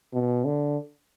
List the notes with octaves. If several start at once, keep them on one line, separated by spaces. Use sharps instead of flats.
B2
D3